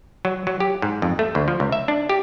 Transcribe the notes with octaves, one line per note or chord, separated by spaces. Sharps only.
F#3
F#3
G4
G#2
F2
A3
D2
F3
C#2
E5
D4
G4